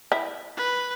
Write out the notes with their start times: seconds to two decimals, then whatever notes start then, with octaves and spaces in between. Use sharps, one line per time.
0.12 E4
0.57 B4